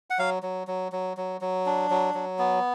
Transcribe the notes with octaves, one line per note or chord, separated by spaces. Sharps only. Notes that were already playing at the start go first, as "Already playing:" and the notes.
F#5
F#3 F5
F#3
F#3
F#3
F#3
F#3
D4
F#3
F#3
B3